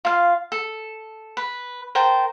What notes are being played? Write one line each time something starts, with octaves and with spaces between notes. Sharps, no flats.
F4 F5
A4
B4
A#4 C5 G5 A5